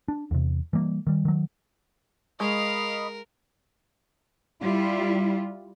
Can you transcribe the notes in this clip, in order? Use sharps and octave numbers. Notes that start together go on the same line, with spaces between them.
D4
E2 C3
E3 G3 A#3
D#3 G3
D#3 F#3
G#3 A#4 D#5 F5 B5 C#6
G3 E4 F4